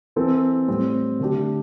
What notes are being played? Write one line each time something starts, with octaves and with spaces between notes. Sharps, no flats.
E3 C4 A4
A2 G3 C4
D3 A3 D4 G4